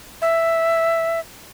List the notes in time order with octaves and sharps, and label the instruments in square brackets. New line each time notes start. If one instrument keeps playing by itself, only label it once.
[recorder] E5